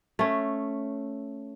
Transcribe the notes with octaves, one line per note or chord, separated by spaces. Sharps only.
A3 C#4